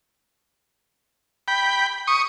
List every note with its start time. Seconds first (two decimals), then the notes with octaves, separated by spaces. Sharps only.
1.48 G5 B5
2.07 C#6 D#6